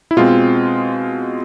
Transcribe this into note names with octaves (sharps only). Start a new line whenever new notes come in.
E4
B2 G#3 C4 F4